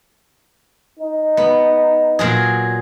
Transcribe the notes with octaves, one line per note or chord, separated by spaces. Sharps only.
D#4
B3
A#2 F#3 G#4